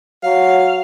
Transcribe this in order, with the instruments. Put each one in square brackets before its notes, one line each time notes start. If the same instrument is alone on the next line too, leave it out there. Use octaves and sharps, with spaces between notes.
[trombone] F#3 [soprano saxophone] F5